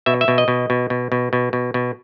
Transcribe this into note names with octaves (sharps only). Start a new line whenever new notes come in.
B2 E5
E5
B2
D#5
B2
B2
B2
B2
B2
B2
B2